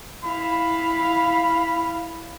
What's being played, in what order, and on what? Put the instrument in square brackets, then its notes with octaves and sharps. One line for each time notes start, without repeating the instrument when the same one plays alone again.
[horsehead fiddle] E4 F5 [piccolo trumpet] B5